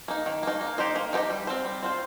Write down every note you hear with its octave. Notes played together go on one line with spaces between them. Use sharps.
A#3 D#4
D#3
A#3 D#4
A#3
D#4 G4 C5 D#5
A#3
D#4 G4 C5 D#5
G3
C4 F4 C5
G3
C4 F4 C5